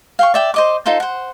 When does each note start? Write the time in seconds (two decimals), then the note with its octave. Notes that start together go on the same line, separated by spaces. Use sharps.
0.19 F5 G5 C#6
0.34 D5 E5 G5
0.54 C5 D#5 D6
0.86 D#4 F4 A4 C5
1.00 C5 F#5